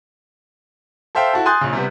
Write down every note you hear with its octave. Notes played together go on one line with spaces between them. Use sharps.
A4 C5 E5 F5 G5
E4 F#4 A4
G#5 C6 D#6 F#6 G6 A6
A#1 C#3
C3 G3 B3